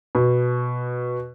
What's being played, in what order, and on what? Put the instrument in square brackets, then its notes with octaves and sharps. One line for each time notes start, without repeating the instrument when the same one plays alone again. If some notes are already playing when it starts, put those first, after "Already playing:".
[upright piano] B2